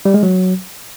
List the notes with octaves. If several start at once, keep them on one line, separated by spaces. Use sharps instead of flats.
G3
G#3
F#3